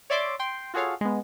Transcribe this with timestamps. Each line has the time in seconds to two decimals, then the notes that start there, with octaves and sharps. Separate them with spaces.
0.10 C#5 D5 E5 C6 D6
0.39 G5 C6
0.74 F4 F#4 G#4 A4 C#5 F5
1.01 G#3 B3